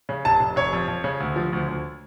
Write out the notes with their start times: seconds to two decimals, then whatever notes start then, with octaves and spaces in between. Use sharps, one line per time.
0.09 C#3
0.25 F1 A5
0.40 F1
0.56 F1 C#5
0.73 F2
0.88 F2
1.04 C#3
1.20 D2
1.36 F3
1.53 D2
1.68 D2